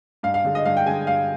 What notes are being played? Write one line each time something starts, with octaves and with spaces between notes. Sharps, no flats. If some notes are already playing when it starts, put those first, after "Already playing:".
G2 F5
F5
D3 G#3
D#5
G2 F5
G5
D3 G#3 G#5
G2 F5